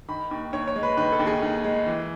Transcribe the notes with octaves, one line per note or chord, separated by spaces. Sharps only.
D#3 B5
D#2
D#2 C#5
C#5
G#3
B4
D#3 B4
A4
D#2
G#4
D#2
G#3
E3